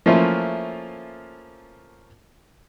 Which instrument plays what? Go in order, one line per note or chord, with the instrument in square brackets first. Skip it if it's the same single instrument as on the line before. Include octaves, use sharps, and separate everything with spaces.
[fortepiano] F3 A3 A#3 C#4 E4 F4